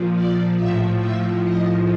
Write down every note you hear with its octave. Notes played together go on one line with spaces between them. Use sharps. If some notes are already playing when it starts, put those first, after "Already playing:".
Already playing: A#2 F3
D5
A2 F3 E5
E5
D#5